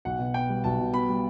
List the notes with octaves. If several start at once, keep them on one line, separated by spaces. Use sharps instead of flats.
B1 F#5
B2
B3 G5
G3
B1 A5
B2
B3 B5
G3